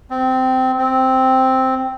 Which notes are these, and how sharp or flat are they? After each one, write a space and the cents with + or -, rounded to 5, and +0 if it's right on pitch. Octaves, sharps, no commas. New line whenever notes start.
C4 -15
C4 +0